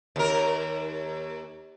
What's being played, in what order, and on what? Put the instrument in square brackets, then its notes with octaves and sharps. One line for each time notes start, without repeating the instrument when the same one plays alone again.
[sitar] D#2 A#4